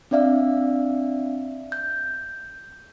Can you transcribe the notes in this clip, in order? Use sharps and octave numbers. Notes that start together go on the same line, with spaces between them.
C4 D4 D5 E5 F5
G6